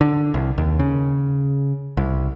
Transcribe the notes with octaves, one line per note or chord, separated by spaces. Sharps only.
D3
C2
D#2
C#3
C2